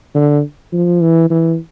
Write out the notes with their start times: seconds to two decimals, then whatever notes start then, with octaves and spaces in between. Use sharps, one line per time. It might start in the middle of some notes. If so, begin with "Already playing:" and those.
0.15 D3
0.72 F3
1.01 E3
1.30 E3